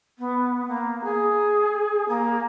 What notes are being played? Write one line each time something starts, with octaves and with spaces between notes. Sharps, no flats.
B3
A#3
G#4
A#3